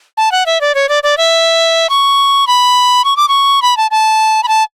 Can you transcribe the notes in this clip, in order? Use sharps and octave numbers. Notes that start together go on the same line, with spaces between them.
A5
F#5
E5
D5
C#5
D5
D5
E5
C#6
B5
C#6
D6
C#6
B5
A5
A5
B5
A5